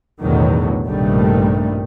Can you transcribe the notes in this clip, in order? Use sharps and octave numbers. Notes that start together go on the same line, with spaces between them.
B1 E2 A2 D3 D#3 F#3
A#1 G2 C3 D#3 G3 A3